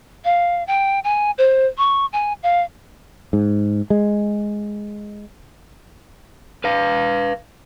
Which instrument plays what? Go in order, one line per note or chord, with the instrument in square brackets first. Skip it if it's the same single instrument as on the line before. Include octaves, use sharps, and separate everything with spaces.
[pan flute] F5
G5
G#5
C5
C#6
G#5
F5
[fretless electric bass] G#2
G#3
[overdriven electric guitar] B4 F5